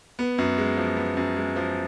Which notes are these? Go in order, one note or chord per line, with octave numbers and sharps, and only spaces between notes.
B3
F#2
G#3
F3
B3
F#2
G#3
F3